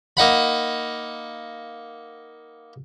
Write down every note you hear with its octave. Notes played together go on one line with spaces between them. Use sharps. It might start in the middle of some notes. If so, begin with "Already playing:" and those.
A#3 D#4 F#5 B5